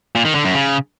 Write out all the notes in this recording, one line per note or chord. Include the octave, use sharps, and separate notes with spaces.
A#2
D#3
D3
F#2
C#3